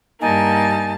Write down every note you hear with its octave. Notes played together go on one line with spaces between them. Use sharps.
G2 A#3 D#4 G#5 A5